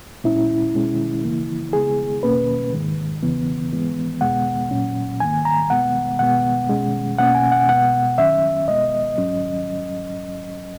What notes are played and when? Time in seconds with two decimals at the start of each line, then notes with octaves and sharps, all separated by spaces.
0.24 A#2 G#3 C#4 E4
0.74 B2 G#3 C#4
1.24 F#2 C#3 E3 A#3
1.73 C#3 G#3 B3 G#4
2.23 E2 B2 A#3 C#4 B4
2.72 G#2 D#3 G#3
3.22 E2 C#3 E3 B3
3.72 G#2 E3 G#3 B3
4.21 E2 B2 G#3 B3 F#5
4.71 A#2 F#3 C#4
5.20 G#2 D#3 A#3 G#5
5.45 A#5
5.70 B2 G#3 B3 F#5
6.19 B2 G#3 B3 F#5
6.69 B2 G#3 C#4
7.18 B2 A#3 C#4 F#5
7.35 G#5
7.52 F#5
7.69 B2 G#3 B3 F#5
8.17 F#2 D#3 F#3 C#4 E5
8.67 B2 G#3 B3 D#5
9.17 G#2 F#3 C#4